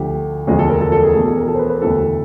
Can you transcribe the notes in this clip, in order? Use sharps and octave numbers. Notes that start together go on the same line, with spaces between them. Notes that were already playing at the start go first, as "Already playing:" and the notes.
Already playing: D2 D3 F3 G4
E1 D2 C#3 F3 G#3
A4
A#4
A4
A4
G#4
E2 B2 G#3 G#4
A4
A#4
A4
C5
B4
B4
E1 D2 C#3 E3 G3 A4